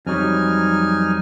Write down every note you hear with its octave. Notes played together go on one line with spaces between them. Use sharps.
F2 F#3 G3 D#4 G#5 F6